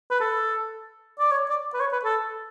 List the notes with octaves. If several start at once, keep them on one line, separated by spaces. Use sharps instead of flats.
B4
A4
D5
C#5
D5
B4
C#5
B4
A4